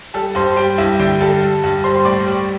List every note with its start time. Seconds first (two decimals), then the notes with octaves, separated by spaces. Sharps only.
0.14 G3 A4 A5
0.35 G2 C5 C6
0.56 G3 G4 G5
0.78 G2 E4 E5
0.99 D3 G4 G5
1.21 G3 A4 A5
1.42 G3
1.64 G2
1.84 G3 C5 C6
1.96 C6
2.05 A2 D5 D6
2.27 G3